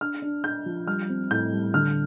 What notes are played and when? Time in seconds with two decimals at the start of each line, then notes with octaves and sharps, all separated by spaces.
0.01 D4 F6
0.22 D4
0.44 D4 G6
0.66 F3
0.87 G3 F6
1.09 C4
1.30 A2 G6
1.52 G3
1.74 D3 F6